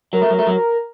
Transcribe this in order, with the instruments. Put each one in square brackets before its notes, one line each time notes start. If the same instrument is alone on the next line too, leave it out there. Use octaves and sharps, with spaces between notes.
[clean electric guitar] F#3 [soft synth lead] A#4
[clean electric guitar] A3
F#3
A3
F#3